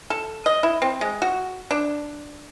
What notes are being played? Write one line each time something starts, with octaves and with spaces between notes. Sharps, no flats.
A4
D#5
E4
C4
G#3
F#4
D4